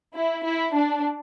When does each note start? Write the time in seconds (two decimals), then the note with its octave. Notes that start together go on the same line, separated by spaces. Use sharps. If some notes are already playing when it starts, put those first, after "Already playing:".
0.15 E4
0.44 E4
0.74 D4